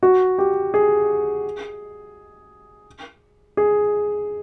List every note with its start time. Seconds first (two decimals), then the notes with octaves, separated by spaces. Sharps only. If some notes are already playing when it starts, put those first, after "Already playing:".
0.03 F#4
0.38 G4
0.74 G#4
3.57 G#4